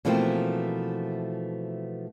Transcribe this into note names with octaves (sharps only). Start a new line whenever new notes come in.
B2 E3 F3 A3 A#3 C4